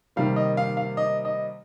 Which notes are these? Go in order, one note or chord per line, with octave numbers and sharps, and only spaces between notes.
C3 D#3 G3 A#3 F5
D#5
F5
F5
D#5
D#5